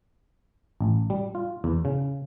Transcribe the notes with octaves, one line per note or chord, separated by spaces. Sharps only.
A1
G3
F4
E2
C#3